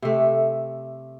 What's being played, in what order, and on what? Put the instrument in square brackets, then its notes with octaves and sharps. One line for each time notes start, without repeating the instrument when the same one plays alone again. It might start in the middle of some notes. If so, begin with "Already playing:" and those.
[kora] C3 A3